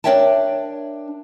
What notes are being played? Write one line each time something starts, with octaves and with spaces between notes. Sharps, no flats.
D4 A#4 C#5 E5 G5 A5